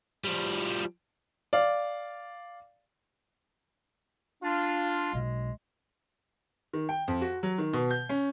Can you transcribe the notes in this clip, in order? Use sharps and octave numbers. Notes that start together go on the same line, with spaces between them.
F3 G3
D5 F5
D4 F4
B1 G#3
D#3
G5
F2
F#4
F#3
D#3
B2
G6
C#4